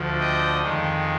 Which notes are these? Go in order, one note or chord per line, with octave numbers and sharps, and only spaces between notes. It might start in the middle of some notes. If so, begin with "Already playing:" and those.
Already playing: D2 D3 F3
D#5 G5
F2 D#3 G#3